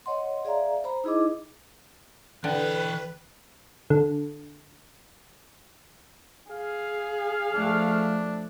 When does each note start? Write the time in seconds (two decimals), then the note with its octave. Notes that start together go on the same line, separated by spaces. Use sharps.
0.06 C#5 D#5 F#5 C6
0.45 G#4 D5 E5 F5 A#5
0.84 C5 A#5 B5
1.04 D#4 E4 G#4 D#5 D6
2.44 D3 E3 B4 G5 F#6
3.90 D3
6.51 G#4 F5
7.54 F3 A3 D4